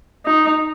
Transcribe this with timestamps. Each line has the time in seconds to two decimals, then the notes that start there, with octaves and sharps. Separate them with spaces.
0.26 D#4